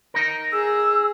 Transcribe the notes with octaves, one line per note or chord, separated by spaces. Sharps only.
D#4 A#4
G#4 E6